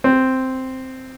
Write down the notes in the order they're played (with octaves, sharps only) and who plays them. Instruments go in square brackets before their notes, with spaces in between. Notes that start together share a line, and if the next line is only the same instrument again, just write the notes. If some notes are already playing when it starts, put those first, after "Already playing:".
[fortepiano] C4